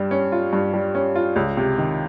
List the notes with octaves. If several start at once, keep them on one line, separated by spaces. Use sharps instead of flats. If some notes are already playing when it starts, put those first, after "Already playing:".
Already playing: G2 G3
C#4
F4
G2
G3
C#4
F4
C#2
C3
D#3